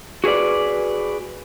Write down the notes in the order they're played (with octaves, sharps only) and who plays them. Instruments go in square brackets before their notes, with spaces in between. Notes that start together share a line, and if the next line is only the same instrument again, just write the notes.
[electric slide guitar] F#4 G#4 B4 D5